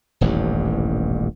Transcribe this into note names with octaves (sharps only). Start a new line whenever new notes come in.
D#1 A1 E2 G2